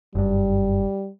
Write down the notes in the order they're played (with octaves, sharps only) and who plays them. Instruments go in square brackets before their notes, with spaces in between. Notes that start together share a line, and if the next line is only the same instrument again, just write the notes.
[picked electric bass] F#1 G2 [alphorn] G3